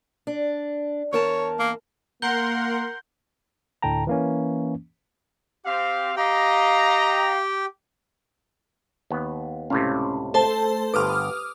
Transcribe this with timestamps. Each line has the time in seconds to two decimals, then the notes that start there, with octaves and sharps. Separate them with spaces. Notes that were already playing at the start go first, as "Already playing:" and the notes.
0.27 D4
1.13 E2 A#4 C#5 A5
1.59 A#3
2.22 A#3 A#4 F#5 C6 G6 G7
3.82 D2 A2 D3 G5 A5 A#5
4.07 E3 A#3 C#4
5.65 C4 G4 F5
6.16 G4 D#5 F5 G5 A#5
9.11 D#2 B3
9.70 C#2 A2 C3 C#4 F5
10.34 A3 A4 C5 A5
10.94 G1 G2 G4 B4 D6 D#6 F6